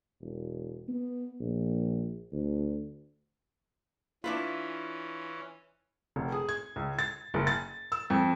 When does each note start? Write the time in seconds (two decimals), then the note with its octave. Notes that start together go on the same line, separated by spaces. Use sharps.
0.21 E1
0.88 B3
1.41 A#1
2.32 D2
4.24 E3 C#4 D4 E4 F4 B4
6.16 F1
6.32 G#4
6.49 G#6
6.76 C#2
6.99 A6
7.34 F#1
7.47 A6
7.92 E6
8.10 F2